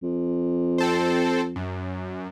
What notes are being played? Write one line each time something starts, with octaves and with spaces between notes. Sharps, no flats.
F2
C4 A4 C5
F#2